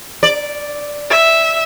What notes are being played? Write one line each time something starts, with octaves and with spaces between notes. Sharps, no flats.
D5
E5